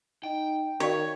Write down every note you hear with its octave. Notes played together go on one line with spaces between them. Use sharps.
D#4 G5
D#3 F#4 C#5 D5 F5